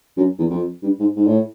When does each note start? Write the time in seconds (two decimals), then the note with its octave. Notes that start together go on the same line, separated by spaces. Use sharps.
0.17 F#2
0.38 E2
0.50 F2
0.83 G2
1.00 G#2
1.16 G#2
1.27 A2